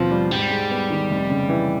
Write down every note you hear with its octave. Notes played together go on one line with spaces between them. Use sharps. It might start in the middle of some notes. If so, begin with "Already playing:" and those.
Already playing: D#2 B2 F3 C4 F4
G3
G#2 G3
G#3
B3
D#3
F1
C#3
E3